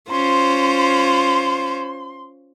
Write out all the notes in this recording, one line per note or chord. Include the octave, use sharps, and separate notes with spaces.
C#4 F4 C5 C6